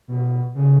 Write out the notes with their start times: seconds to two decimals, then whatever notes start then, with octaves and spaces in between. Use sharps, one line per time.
0.08 B2
0.55 C#3